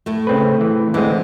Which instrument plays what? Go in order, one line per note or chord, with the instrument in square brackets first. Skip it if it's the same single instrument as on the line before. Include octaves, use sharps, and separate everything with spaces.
[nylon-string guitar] A2 A3
[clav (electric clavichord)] C#3 C4 B4
E3
[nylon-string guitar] D3 [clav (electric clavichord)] E3 G#3 C4